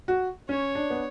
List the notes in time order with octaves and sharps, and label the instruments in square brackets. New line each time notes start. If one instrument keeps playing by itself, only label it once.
[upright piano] F#4
[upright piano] C#4 [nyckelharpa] C#5
[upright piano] D4
B3